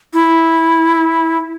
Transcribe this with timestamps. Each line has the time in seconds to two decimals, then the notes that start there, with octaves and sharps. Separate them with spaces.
0.13 E4